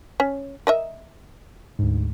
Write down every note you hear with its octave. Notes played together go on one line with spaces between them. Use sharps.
C#4
A#4 D#5 E5
D2 G#2